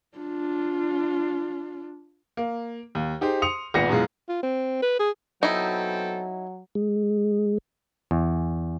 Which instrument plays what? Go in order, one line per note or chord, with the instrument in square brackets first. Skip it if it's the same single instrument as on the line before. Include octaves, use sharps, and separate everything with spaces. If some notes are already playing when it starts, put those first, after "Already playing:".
[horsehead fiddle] D4 F4
[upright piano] A#3
D#2
D#4 G4 G#4 C5
C6 D#6 C#7 F7
G#1 A#2 B3 A#6 C#7
F#2 B2 E3 G#3 F4
[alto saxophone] F4
C4
B4
G#4
[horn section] B2 C4 A4 [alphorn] F#3 [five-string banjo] D#4 E4
[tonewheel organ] G#3
[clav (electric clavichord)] E2